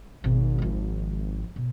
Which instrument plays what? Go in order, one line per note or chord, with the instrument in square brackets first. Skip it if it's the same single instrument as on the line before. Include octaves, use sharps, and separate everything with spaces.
[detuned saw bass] G#1 [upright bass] B2
[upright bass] F3 F4
B2